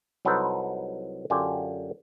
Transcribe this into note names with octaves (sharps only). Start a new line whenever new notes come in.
C2 F#3 D#4 A4 B4 C5
F#2 D3 D4 F4 G4 G#5